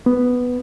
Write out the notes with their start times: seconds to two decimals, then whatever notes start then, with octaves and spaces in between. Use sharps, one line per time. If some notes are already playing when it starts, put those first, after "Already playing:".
0.06 B3